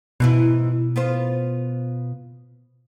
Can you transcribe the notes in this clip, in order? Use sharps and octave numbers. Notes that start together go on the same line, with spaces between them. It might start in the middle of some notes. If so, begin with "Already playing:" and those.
G#2 B2 E3 E4
B3 F4 C5